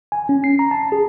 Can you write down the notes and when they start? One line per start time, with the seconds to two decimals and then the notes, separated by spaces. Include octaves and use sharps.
0.12 G#5
0.29 C#4
0.44 C7
0.59 A#5
0.71 A5
0.92 G#4